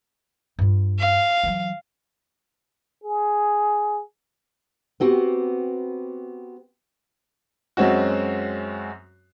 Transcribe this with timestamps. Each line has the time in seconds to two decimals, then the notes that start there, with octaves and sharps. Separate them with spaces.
0.59 G2 F4
0.99 F5
1.43 E3 F#3
3.04 G#4
5.00 B3 C4 F#4 G4
7.77 F#2 G#3 C4 C#4 F#4